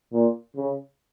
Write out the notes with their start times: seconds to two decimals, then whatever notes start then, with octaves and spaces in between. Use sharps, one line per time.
0.13 A#2
0.56 C#3